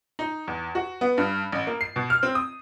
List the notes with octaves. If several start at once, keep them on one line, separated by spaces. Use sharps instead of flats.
D#4
E2
F#4
B3
G2
A1
A#3
C7
B2
F6
C4
D#6